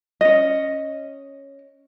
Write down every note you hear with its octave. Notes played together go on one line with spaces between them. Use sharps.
C#4 D#5